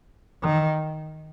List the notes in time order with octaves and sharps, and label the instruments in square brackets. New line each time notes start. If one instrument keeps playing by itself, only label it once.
[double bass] D#3